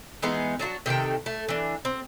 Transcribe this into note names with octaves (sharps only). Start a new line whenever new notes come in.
E3 G#3 B3 D#4
F#3 D4 F4 F#4
C3 D#3 A3 G5
A3
E3 D4
C4